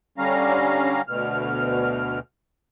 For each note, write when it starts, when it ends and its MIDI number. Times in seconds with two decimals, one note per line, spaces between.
0.18 1.02 50
0.18 1.02 55
0.18 1.02 61
0.18 1.02 77
0.18 1.02 82
1.08 2.19 38
1.08 2.19 47
1.08 2.19 89